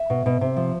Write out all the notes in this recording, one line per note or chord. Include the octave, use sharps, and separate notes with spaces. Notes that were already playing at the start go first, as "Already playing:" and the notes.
Already playing: E5
B2
B2
C3
F3